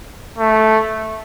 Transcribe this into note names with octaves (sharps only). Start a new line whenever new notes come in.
A3